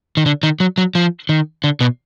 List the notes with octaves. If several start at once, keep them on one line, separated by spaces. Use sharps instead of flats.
D#3
D3
D#3
F#3
F#3
F3
D#3
D3
B2